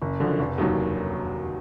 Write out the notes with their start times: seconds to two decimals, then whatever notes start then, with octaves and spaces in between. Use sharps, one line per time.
0.02 F#1
0.20 F#2 D3 F3
0.39 F1
0.58 D#2 D#3 F#3